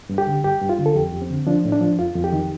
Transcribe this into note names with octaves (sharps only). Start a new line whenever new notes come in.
G2
G4
D3
G2 G4
G2
F4
D3
A4
F2 G4
F2
C4
D3
F3 D4
A2
D4
F3
F2 F4
F2
G4
D#3